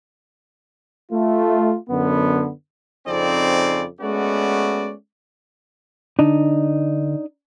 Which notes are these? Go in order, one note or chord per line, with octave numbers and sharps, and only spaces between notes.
A3 F4
F#2 D3 B3
F2 C#3 C4 D#4 G#4 D5
G#3 A3 B3 C#4 F#4 D5
D3 D4 D#4